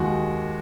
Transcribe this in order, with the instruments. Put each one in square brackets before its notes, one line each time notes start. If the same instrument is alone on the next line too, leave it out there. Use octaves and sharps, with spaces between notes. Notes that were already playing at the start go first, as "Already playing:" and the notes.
Already playing: [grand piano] D#2 D#3 G#3 F#4